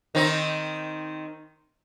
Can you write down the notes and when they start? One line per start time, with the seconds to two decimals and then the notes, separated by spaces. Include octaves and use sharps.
0.15 D#3 C4 D#4